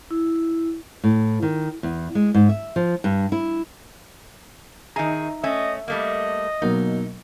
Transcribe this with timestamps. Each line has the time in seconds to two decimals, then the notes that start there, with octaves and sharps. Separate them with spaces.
0.11 E4
1.04 A2
1.43 D#3
1.83 E2
2.15 G#3
2.34 G#2
2.49 E5
2.76 F3
3.04 G2
3.32 E4
4.96 D#3 D#4 G#4 E5 A#5
5.44 A3 C#4 D#5 E5
5.88 G3 A3 A#3 D#5
6.62 B2 F#3 A#3 D#4